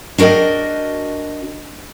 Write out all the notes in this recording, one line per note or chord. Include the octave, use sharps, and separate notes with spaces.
D4 F#4 A#4 D#5 G5